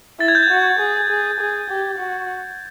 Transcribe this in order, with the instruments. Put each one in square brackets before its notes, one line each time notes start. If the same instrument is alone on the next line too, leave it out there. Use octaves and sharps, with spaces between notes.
[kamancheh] E4 [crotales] A6
[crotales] G#6
G6
G#6
[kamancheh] F#4
G#4
G#4
G#4
G4
F#4